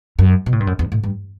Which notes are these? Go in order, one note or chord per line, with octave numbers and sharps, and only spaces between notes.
F#2
B2
A2
G2
F#2
E2
A2
G2